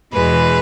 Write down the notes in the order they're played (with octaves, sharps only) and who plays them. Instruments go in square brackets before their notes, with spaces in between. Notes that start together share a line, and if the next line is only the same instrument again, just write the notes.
[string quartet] E2 B2 G#3 B4